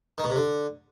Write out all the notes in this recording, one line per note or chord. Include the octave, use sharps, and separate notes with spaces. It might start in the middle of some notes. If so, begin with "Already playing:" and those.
D#3
B2
C3
D3